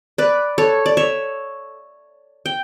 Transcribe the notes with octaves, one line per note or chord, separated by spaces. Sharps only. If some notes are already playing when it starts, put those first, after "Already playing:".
B4 D5
A4 C#5
D5
C#5 E5
G5